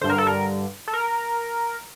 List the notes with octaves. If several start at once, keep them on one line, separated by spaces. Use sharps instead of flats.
G2 D3 C5
A#4
A4
A#4
A4
A#4